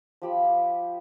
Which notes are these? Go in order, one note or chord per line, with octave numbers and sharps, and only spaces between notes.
F3 G4 B5